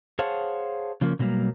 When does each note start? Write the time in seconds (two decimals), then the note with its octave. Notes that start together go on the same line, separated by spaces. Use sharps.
0.19 G#4 C5 C#5 F5 F#5 A5
1.01 C#3 F3 A#3
1.19 B2 D3 F#3 G3 A#3